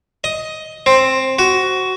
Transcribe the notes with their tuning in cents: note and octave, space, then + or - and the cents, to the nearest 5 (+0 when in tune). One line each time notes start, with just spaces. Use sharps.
D#5 +10
C4 +10
F#4 +15